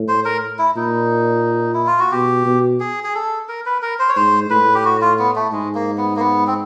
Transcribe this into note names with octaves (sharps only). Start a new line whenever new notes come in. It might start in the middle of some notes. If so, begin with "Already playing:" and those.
Already playing: A2
C5
A#4
E4
A#2 D#4
E4
F4
F#4
B2 G4
B2
G#4
G#4
A4
A#4
B4
A#4
C5
C#5
G#2 C5
A2 B4
G4
F#4
F4
B3
A3
G#2 G#3
A#3
B3
A#3
B3
C4